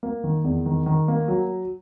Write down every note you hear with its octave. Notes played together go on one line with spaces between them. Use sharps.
A#3
D#3
E2
D#3
D#3
A#3
F#3